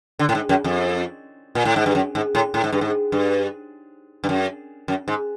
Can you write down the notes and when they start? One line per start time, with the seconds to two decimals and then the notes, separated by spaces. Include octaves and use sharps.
0.19 D3
0.29 A2
0.35 G#2
0.49 F#2
0.64 F2
1.55 A#2
1.65 A2
1.76 G#2
1.86 G2
1.95 F#2
2.15 G#2
2.35 A2
2.54 A2
2.64 G#2
2.72 G2
2.81 G#2
3.12 G2
4.24 G2
4.29 F#2
4.88 F#2
5.08 G#2